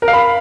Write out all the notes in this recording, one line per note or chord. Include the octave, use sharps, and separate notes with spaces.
A#4
F5
B5